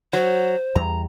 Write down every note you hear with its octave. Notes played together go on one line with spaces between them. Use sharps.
F#3 C5 C#5
E2 G3 A#5